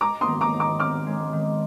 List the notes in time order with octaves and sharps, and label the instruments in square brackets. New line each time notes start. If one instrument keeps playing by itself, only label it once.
[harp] G#3 [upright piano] A#5 D6
[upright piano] C6 D#6
[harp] D#3
[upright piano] A#5 D6
[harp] D#4
[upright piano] A#5 D6
[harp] C4 [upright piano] D6 F6
[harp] G#3
D#3